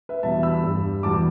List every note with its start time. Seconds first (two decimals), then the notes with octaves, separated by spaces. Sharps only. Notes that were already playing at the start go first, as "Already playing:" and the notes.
0.09 B4 E5
0.23 E2 B2 G3 E5 A5
0.43 B5 E6
0.64 G2 G3
1.03 E2 B2 G3 A5 D6